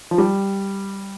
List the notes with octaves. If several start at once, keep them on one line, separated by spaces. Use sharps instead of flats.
F3
G3